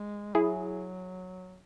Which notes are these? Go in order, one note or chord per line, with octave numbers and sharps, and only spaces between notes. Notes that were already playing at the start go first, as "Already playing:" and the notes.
Already playing: G#3
F#3 E4 G#4